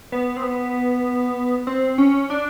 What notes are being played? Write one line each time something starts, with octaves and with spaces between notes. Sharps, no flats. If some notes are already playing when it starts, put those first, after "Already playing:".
B3
C4
B3
C4
C#4
D4